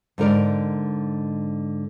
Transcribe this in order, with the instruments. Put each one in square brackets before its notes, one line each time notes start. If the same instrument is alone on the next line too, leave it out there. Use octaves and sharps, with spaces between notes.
[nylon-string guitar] G#2 D3 A#4 D5